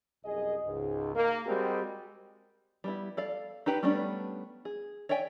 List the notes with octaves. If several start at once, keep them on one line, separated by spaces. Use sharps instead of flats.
C2 F#2 G#4 D#5
C#2 G#2
A#3
G3 G#3 C4 F#4 G4 A#4
G3 B3 E4
A4 D5 F5
D#4 G4 B4 G5 A#5
G3 A3 B3 C#4 D4
G#4
C#5 D5 E5 G5 G#5